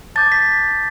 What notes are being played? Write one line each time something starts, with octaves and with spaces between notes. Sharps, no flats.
A5 D6 G6 A6
B6